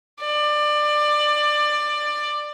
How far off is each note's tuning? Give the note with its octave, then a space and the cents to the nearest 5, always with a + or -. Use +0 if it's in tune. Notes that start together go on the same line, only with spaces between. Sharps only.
D5 +20